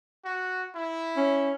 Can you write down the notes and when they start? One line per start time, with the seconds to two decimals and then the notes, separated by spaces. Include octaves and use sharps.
0.25 F#4
0.75 E4
1.17 C#4